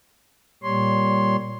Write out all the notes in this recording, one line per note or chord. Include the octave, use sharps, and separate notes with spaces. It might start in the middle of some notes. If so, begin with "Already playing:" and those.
A#2 G3 C#5 C6